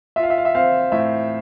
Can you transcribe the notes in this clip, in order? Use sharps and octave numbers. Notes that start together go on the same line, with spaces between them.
F4 E5
F5
E5
F5
E5
C4 F5
A2 E5